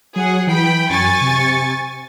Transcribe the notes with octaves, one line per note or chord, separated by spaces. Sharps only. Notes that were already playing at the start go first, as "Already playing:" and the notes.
F#3 G#4 F#5
E3 G5 B5
F#2 G#5 C#6 A6
C3